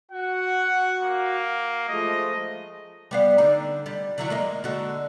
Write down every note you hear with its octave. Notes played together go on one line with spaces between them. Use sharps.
F#4 F#5
A#3
F3 G#3 A3 D#5
G3 B3 F5
D3 D#4
G3
D3 F#3 E4
G#3 A#3 D#5
D3 F#4